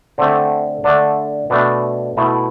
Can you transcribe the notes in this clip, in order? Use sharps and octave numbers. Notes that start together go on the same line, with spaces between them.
D3 A3 C4
D3 A3 D4
B2 A3 D4
B2 A3 E4